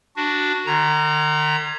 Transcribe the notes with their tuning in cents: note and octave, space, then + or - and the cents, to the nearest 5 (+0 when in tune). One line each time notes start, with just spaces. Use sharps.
D4 +0 F#4 +0
D#3 -45 A#5 +0